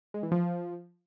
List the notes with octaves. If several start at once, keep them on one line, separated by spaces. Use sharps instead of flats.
G#3
E3
F3